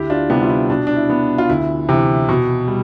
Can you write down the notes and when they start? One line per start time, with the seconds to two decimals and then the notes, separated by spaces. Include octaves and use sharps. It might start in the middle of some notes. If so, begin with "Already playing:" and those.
Already playing: D2 E4 G4
0.10 D4 F4
0.30 C3 G3 B3 E4
0.42 F4
0.50 E4
0.69 B2 D4
0.87 D4
0.96 E4
1.10 B3
1.38 F4
1.49 D2 E4
1.89 C3 E3
2.29 B2
2.68 G3